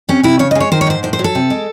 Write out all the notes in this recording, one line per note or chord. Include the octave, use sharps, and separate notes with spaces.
C3 C#4
C3 E4
C#3 C#5
D#5
G#3
C#5
D#3 C5
C#5
G#2 C5
A2 C5
C5
F#3
A4
C3
G#3